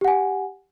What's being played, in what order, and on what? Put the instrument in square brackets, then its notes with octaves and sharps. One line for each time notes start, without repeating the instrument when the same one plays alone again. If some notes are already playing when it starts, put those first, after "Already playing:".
[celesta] G4
F#5
G#5